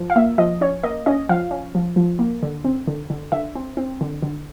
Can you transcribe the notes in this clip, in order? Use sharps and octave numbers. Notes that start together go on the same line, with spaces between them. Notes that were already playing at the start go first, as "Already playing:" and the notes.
Already playing: F3
F5
A#3 E5
F3 D#5
C#4 C#5
A#3 D#5
C#4 D#5
F3 F5
C#4
F3
F3
A#3
D3
C4
D3
D3
D3 E5
C4
C4
D3
D3